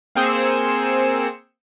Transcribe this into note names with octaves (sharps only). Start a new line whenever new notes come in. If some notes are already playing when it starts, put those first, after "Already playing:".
A#3 C4 G#4 C5 E6 C#7